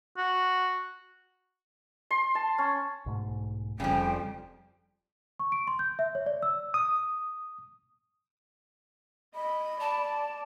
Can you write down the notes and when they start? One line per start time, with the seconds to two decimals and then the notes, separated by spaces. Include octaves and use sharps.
0.18 F#4
2.11 C6
2.35 A5
2.58 C#4
3.06 B1 G#2 A3
3.80 F1 F2 C#3 F3 G3 G5
5.40 C#6
5.52 D7
5.67 C6
5.79 G6
5.99 E5
6.15 C#5
6.26 D5
6.43 E6
6.74 D#6
9.35 D#5 B5
9.81 D5 A5